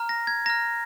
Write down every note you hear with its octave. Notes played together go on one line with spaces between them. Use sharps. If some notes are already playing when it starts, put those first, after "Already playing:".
Already playing: A#5 F6
A#6
G#6
A#5 F6 A#6